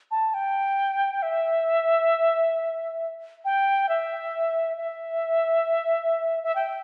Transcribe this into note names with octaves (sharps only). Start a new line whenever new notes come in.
A5
G5
E5
G5
E5
E5
E5
G5